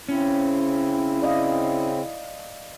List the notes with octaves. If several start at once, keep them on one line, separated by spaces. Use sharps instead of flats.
C#3 C4 C#4 E4
D5 D#5 F5